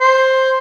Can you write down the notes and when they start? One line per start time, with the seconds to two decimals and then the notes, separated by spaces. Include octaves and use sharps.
0.01 C5